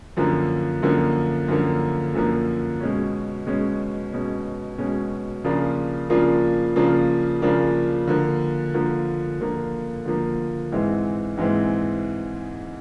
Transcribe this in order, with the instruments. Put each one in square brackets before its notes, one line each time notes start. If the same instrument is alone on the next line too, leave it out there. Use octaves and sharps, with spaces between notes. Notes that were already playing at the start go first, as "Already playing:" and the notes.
[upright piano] F#2 D3 F3 A#3
F#2 D3 F3 A#3
F#2 D3 F3 A#3
F#2 D3 F3 A#3
B2 G#3 C#4
B2 G#3 C#4
B2 G#3 C#4
B2 G#3 C#4
C#3 F3 A#3 D4 F4
C#3 F3 A#3 D4 F4
C#3 F3 A#3 D4 F4
C#3 F3 A#3 D4 F4
D3 F3 A#3
D3 F3 A#3
D3 F3 A#3
D3 F3 A#3
G#2 E3 G#3 C4 E4
G#2 E3 G#3 C4 E4